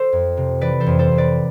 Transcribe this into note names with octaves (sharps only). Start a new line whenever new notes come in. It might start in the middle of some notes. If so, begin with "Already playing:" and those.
Already playing: A4 C5
F2
C3
E3 B4 D5
A4 C5
F2
A4 C5
F2
B4 D5